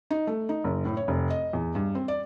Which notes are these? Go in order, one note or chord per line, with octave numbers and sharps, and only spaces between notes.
D#4
A3
D#4
F#1
A2
C#5
F1
D#5
E2
G2
C4
D5